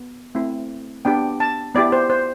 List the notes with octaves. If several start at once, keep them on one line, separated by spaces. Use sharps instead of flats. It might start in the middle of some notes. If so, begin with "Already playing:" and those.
Already playing: B3
A3 C4 E4
B3 D4 G4 G5
A5
B3 E4 G4 D5
C5
C5